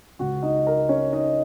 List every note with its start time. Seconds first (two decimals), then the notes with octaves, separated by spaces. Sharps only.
0.19 C#2 C#3 G#3 F#4 F#5
0.43 D#4 D#5
0.67 A#4
0.89 C#4 C#5
1.12 D#4 D#5